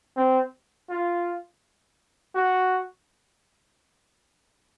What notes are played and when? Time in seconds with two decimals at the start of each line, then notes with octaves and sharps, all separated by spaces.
0.17 C4
0.90 F4
2.35 F#4